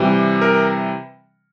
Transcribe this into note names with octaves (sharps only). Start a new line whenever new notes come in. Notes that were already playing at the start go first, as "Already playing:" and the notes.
Already playing: C3 E3 G3
A#4